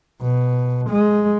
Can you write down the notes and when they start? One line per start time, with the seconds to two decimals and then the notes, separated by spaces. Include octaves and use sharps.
0.22 B2
0.90 G#3